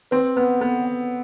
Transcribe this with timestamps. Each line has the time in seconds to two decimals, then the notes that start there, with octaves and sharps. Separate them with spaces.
0.11 C4 B4
0.37 B3 B4
0.61 B3 A4
0.85 F#5